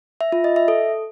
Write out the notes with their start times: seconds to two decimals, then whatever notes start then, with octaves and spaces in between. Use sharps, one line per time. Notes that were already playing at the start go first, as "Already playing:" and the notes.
0.21 E5
0.32 F4
0.44 D#5
0.56 E5
0.68 A4